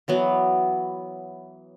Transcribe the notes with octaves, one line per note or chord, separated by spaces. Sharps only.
E3 F#3 B3